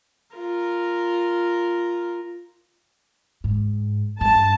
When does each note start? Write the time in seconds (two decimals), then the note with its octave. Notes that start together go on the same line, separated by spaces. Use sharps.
0.36 F4 A#4
3.44 G#2
4.21 G2 A5